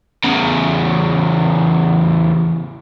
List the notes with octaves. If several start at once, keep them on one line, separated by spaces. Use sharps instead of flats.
E2 C#3